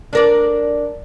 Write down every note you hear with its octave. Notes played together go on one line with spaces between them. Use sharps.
D4 A#4 D5